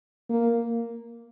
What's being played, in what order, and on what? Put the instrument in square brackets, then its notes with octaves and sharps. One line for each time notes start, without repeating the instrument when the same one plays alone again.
[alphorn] A#3